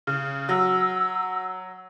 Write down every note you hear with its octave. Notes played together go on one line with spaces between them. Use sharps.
C#3
F#3 E6